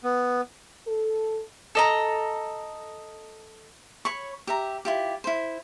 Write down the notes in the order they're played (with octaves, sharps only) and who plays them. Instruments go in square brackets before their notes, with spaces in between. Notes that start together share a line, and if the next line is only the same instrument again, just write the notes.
[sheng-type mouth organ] B3
[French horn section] A4
[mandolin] A4 D#5 A#5
[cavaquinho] C#5 B5 C#6
G4 E5 A#5
E4 F4 G4
E4 C5